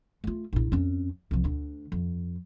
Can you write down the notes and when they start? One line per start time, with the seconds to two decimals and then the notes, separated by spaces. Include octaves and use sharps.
0.24 A3 F4
0.53 A#1 E4
0.72 F2 C#4
1.31 C2 F3
1.44 D2 D3
1.92 F2